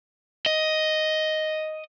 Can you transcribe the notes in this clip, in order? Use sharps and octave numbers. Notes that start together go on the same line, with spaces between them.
D#5